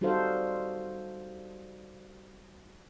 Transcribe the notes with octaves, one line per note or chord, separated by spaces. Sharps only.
G3 D#4 F#4 A4 C5 F5